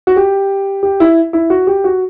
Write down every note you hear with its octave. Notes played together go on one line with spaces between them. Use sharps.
F#4
G4
G4
E4
E4
F#4
G4
F#4